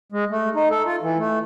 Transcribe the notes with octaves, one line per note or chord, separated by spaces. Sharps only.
G#3
A3
D#4
A4
F4
E3
A3